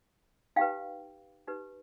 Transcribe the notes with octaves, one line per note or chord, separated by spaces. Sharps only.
D#4 G4 B4 F5 G5
D#4 G4 B4